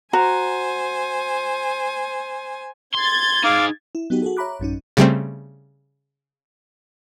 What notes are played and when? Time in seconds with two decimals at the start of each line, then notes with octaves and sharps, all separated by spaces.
0.13 F#4 C5 G#5 A#5
2.95 C6 G#6 A6
3.44 D#4 G#4 F5 D6
3.95 E4
4.10 F#3 B3 D#4 F#4 G4
4.22 F#4 G#4 A4
4.37 C#5 E5 A#5 B5 D6 F#6
4.60 A1 F#2 C#4 D#4
4.97 C#3 G3 A3 C4